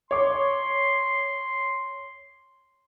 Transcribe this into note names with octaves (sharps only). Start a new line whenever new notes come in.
C#5 C6 D6